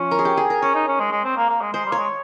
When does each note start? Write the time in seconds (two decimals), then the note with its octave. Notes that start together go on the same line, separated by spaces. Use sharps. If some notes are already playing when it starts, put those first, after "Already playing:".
Already playing: F3 C#4
0.11 A#4
0.19 G#4
0.25 G4
0.37 G#4
0.50 A#4
0.62 C#4 C#5
0.74 D#4
0.88 C#4
1.00 G#3
1.12 G#3
1.24 C4
1.37 A#3
1.49 A#3
1.61 G#3
1.73 G#3 C5
1.85 G3
1.92 A#3 C#5
1.97 G#3